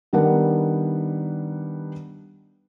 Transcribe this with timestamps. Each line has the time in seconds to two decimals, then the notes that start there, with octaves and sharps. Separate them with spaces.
0.13 D#3 G3 B3 D4 A#4 F#5